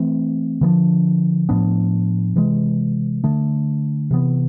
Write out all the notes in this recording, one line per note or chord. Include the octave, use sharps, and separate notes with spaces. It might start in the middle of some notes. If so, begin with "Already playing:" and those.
Already playing: E3 A3 C4
D3 F3 B3 D4
A2 F3 B3 D4
C3 E3 G#3
D3 A3 D4
C3 E3 B3